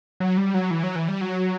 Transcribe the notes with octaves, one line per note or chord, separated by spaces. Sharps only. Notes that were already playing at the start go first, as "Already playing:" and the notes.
F#3
G3
F#3
E3
F#3
E3
G3
F#3